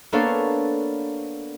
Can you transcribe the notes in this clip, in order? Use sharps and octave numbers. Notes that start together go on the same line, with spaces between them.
A#3 B3 D4 A4 C#5 F5